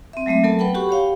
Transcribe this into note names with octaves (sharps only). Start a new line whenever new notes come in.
C4 E5
F#3 G#3 A3 C4 E5
F#3 B3 A4 A#4 A5
B4 F#5 G5 B5
F#4 G4 F#5 B5 C#6
G4 C#5 F5 G5